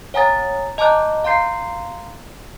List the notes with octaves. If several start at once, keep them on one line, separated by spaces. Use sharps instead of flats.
C#5 F#5 G#5 A#5 D#6 A6
D#5 A5 A#5 D6 F#6 G6
F5 A#5 C6 G6 C7